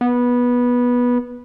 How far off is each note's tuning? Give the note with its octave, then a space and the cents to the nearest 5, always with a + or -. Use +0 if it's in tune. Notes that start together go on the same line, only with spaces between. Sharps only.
B3 -15